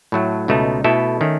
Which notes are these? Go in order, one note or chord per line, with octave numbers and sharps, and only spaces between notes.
A2 F#3 A3
C#2 B2 A3 D#4
B2 A3 E4 A4
D#3 A3 C#4